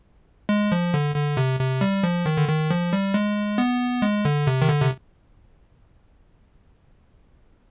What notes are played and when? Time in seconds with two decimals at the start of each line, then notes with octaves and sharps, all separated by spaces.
0.49 G#3
0.72 F3
0.94 D3
1.16 D3
1.37 C3
1.60 C3
1.81 G3
2.03 F3
2.26 D#3
2.37 D3
2.49 D#3
2.71 F3
2.93 G3
3.14 G#3
3.58 B3
4.02 G#3
4.25 D3
4.47 C3
4.62 D#3
4.69 D3
4.81 C3